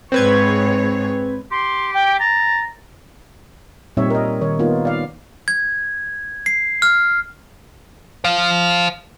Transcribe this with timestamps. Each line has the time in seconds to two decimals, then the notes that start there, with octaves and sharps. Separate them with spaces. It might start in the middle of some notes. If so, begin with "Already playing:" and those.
0.12 G#2 C4 G#4 B4 C#5 G#6
1.51 G4 C6
1.94 G5
2.20 A#5 A6
3.97 A#2 G3 C4 D#4 C#5 E5
4.10 A#4 D#5
4.41 D#3 C#5
4.59 A#3 B3 D#4 F4
4.85 D5 F5
5.48 G#6
6.46 C7
6.82 F6
8.24 C5 F5